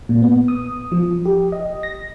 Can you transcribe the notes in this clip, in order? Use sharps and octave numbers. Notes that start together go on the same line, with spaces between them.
A#2
B3
D#6
F3
G4
D#5
A#6